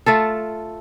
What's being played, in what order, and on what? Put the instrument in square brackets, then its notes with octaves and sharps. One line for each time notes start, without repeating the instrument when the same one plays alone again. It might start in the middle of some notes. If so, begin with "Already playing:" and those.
[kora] A3 F4 A4